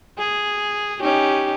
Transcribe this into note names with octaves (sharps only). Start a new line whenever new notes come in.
G#4
C#4 D#4 G4